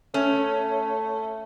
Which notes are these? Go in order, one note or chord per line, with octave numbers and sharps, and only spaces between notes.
A3 C#4